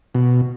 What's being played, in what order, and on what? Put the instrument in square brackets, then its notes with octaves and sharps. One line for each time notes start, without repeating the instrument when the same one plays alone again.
[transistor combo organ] B2